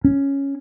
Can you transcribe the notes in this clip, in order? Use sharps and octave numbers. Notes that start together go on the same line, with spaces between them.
C#4